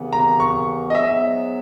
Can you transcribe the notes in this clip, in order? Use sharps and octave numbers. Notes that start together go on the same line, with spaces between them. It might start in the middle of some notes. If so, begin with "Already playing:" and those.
Already playing: D#2 C#3 E3 B3
A#5
C#6
D#5
G#2 F#3 B3 E5